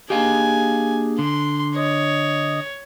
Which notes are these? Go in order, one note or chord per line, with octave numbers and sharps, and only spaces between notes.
A#3 D4 G4 G#4 D#5 F5 G#5
D3 C6
C#5 D#5 D#6